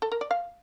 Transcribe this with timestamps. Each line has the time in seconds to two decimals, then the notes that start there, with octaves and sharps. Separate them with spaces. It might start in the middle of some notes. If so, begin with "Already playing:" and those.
0.02 A4
0.12 A#4
0.21 D5
0.31 F5